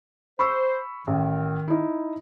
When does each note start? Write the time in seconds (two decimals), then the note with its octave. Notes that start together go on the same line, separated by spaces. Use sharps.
0.39 C5 B5 C#6 E6
1.07 A1 D#3
1.68 D#4 E4